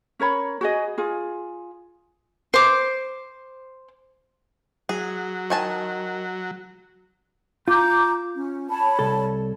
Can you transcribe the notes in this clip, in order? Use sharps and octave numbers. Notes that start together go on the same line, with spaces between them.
C#4 A#4 C#5 B5
F#4 G#4 D#5
F4 G#4
C5 D6
F#3 G#4
D#3 G#5 A5
F4 A#5 D6 G6
C#4
C#5 A5 B5
C2 A4